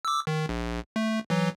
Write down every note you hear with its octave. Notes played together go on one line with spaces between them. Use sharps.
D6 E6
D#3
A#1
A3
E3 F#3